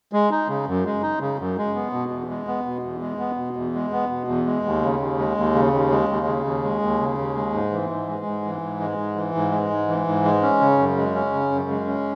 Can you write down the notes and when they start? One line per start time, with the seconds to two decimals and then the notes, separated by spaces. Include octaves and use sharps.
0.13 G#3
0.31 D#4
0.48 C#3
0.67 F#2
0.85 G#3
1.02 D#4
1.20 C#3
1.39 F#2
1.58 G#3
1.75 B3
1.93 B2
2.12 E2
2.30 G#3
2.47 B3
2.66 B2
2.83 E2
3.01 G#3
3.19 B3
3.37 B2
3.56 E2
3.74 G#3
3.92 B3
4.09 B2
4.28 E2
4.46 G#3
4.64 D#2
4.82 C#3
5.00 D#2
5.18 G#3
5.37 D#2
5.54 C#3
5.73 D#2
5.91 G#3
6.09 D#2
6.27 C#3
6.45 D#2
6.63 G#3
6.82 D#2
7.00 C#3
7.18 D#2
7.35 G#3
7.53 G#2
7.72 E3
7.90 G#2
8.08 G#3
8.25 G#2
8.44 E3
8.61 G#2
8.80 G#3
8.98 G#2
9.16 E3
9.35 G#2
9.52 G#3
9.70 G#2
9.88 E3
10.07 G#2
10.25 G#3
10.42 C#4
10.61 C#3
10.78 F#2
10.97 G#3
11.15 C#4
11.33 C#3
11.51 F#2
11.69 G#3
11.87 C#4